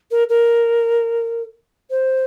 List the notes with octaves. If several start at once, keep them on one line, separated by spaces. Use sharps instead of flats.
A#4
A#4
C5